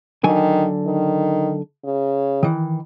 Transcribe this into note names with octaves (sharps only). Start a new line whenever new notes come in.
D3 D#3 F#3 G#5
D#3
C#3
D#3 E3